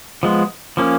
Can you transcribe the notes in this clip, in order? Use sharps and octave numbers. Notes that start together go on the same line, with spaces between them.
F3 G#3 B3
F3 A#3 C#4